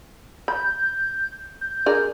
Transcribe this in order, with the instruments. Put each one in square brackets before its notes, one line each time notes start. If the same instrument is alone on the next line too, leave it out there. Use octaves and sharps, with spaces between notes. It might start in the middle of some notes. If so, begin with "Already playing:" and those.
[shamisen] B5 [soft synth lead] G6
[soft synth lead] G6
[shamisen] D4 G#4 A#4